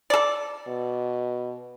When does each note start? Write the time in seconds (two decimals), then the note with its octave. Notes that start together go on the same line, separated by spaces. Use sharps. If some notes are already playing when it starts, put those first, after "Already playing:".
0.10 A4 D5
0.68 B2